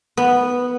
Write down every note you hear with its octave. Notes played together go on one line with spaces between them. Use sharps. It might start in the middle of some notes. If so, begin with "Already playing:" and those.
B3